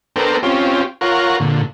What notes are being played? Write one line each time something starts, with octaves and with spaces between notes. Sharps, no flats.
B3 D4 A4 A#4 C5 G5
C4 C#4 F4 G4
F4 A#4 C#5 F#5
A#2 D3